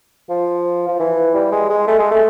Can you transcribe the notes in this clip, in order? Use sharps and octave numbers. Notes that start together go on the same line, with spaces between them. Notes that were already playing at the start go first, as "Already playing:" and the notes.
F3
F3
E3
G3
G#3
G#3
A3
G#3
A3